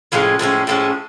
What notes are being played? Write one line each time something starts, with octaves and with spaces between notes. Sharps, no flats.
A2 F3 G#3 C#4
A2 F3 G#3 C#4
A2 F3 G#3 C#4